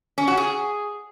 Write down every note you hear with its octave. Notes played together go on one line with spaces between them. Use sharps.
C#4
F#4
G#4